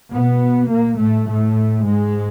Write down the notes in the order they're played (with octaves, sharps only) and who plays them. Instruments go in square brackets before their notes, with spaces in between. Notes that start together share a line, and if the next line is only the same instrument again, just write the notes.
[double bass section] B2 B3
A#2 A#3
A2 A3
A2 A3
G#2 G#3